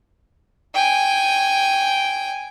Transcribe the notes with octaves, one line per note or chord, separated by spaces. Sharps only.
G5 G#5